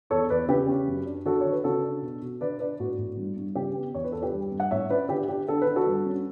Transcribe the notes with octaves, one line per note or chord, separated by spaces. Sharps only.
E2 A4 C#5
E2 B4 D5
C#3 G4 B4
C#4
F#2
D4
D3 F#4 A4
D3 C#5
B4
C#3 F#4 A4
D4
B2
B2
D3 B4 D5
D4 B4 D5
A2 F#4
A2
G2
G2
C#3 G4
B3
E2 C#5
B4
E2 A4
G4 B4
G2
G2
F#5
A2 C#5 E5
C#4 B4 D5
D3 G4
D4 G4
D3 A4
D3 B4
F#4 A4
G2
C#4